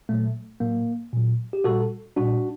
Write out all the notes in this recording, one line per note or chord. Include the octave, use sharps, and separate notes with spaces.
A#2 F#3 A3
A2 F#3 A#3
A#2 F#3
G4
A#2 G3 F#4 A4
A#2 G3 D4 F#4